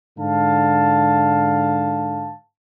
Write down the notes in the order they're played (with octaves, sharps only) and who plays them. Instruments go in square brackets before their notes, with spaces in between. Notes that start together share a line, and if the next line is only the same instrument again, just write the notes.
[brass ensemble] G#2 D3 F5 A5